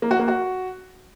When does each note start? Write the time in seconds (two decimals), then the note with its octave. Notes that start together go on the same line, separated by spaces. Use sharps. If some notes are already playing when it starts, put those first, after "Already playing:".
0.02 A#3
0.11 F#4
0.19 A#3
0.28 F#4